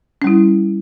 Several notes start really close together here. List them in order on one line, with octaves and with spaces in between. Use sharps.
C#4 G3 E4